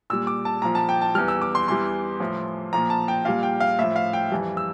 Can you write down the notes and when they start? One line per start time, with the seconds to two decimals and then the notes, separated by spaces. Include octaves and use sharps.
0.10 A#2 G3 E6
0.27 D6
0.45 A5
0.62 A#2 F3 A#5
0.75 A5
0.89 G5
1.02 A5
1.15 E2 E3 G3 F6
1.28 E6
1.42 D6
1.55 C6
1.68 E2 E3 G3 C6
2.20 A2 F3
2.73 A#2 F3 A#5
2.90 A5
3.08 G5
3.25 A#2 G3 F5
3.43 G5
3.60 F5
3.79 A2 F3 E5
3.96 F5
4.13 G5
4.32 F2 E3 G3
4.57 E6